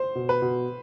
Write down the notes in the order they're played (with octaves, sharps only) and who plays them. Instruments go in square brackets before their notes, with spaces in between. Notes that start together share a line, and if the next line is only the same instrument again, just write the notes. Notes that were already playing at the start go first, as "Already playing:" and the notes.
Already playing: [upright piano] C5
[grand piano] B2
[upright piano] B4
[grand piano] B2